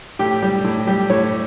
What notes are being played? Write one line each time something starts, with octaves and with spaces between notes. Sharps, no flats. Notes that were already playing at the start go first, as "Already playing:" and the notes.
A2 G4
G3 G4
A2
G3 G4
A2 C#5